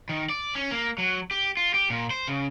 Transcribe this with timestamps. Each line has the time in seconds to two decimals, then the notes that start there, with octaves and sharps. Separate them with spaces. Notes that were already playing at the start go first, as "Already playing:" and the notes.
0.09 D#3
0.30 D5
0.55 C#4
0.71 A#3
0.98 F#3
1.31 G4
1.57 F4
1.74 G4
1.90 A#2
2.10 C5
2.28 C#3